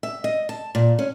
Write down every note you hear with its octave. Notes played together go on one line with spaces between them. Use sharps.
E5
D#5
A5
A#2
C#4